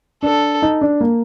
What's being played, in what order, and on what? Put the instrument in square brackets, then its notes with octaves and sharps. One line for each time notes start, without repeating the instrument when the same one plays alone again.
[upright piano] D4 [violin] A4
[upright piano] D#4
D4
A#3